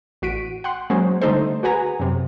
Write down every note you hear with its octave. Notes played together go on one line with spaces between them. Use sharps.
A1 F#4 B6 D7 D#7
F#5 G5 C6
F#3 G#3 A#3 C#4 C5
D3 G3 A3 D#4 A4 C5
F#4 G#4 B4 F#5 G#5 A#5
F#2 C3